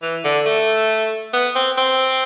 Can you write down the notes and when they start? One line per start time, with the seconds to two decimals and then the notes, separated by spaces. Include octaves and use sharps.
0.02 E3
0.24 D3
0.46 A3
1.33 B3
1.55 C4
1.77 C4